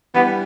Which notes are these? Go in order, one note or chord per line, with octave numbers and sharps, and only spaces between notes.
E3 G3 B3 D4 G4